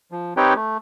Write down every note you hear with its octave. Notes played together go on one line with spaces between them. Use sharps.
F3
C4 D#4 G4 B4 C#5 G5
A3